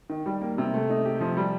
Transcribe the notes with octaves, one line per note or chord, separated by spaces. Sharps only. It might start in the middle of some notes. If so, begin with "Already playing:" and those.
D#3
G3
A#3
C3
A3
D#4
G4
F3
G3